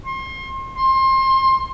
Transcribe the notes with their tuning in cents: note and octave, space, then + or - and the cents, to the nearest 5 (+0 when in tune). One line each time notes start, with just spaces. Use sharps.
C6 +35
C6 +25